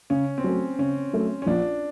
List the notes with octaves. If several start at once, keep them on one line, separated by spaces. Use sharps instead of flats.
C#3 C#4
C4
F#3 A3 C#4
C#3 C#4
F#3 A3
C#4
A#1 D4